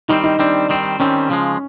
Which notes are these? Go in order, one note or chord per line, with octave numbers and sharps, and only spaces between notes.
D#3 G3 C4 D#4
D#4
D#3 G3 C4 D4
D#3 G3 C4
D#3 G3 C4 C#4
C#3 F3 G#3